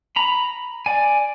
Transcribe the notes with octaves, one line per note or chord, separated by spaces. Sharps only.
A#5 B5
D5 G#5